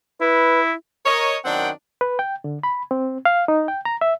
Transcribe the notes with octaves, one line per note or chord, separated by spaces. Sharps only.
E4 B4
A#4 C#5 D#5
F#2 D#3 C4 D4 F#5 G5
B4
G5
D3
B5
C4
F5
D#4
G5
A#5
E5